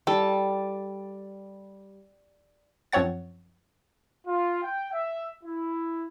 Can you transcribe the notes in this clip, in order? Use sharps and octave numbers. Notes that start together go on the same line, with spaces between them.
G3 A4
F#2 F3 C4 C#5 F#5 A6
F4
G5
E5
E4